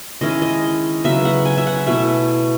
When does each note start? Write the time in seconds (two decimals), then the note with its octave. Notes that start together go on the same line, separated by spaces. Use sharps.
0.21 D#3 G#3 C#4 E4 D#5
0.42 D#5
1.04 C#3 F#3 B3 E5
1.25 F#5
1.45 G#5
1.58 E5
1.67 F#5
1.86 B2 A3 E4 E5